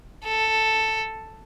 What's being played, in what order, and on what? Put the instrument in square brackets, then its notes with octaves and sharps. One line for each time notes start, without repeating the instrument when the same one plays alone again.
[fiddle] A4